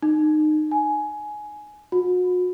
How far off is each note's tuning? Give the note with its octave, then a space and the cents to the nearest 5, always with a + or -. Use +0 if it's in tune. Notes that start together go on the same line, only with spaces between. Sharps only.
D#4 -25
G#5 +15
F#4 -40